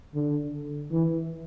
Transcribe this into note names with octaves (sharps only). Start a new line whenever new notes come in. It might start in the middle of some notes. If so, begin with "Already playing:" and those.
D3
E3